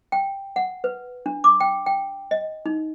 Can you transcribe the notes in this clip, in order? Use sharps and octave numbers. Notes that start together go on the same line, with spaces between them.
G5
F#5
B4
D4
D6
G5
G5
D#5
D#4